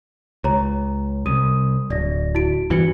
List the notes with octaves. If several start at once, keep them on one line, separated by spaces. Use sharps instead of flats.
C#2 C#5 A#5
C2 D#6 D#7
D1 D5 A#6
E4 F#4 D7
E2 G2 E3 F#4 C#7